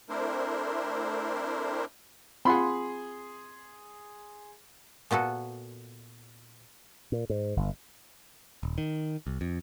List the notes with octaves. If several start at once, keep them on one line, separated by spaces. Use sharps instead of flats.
A3 C4 D4 E4 A#4 C5
C4 F4 G#4 F#5 B5 C6
A#2 B3 F#4 A4
A#2
G#2
G1
D#1
D#3
C2
F2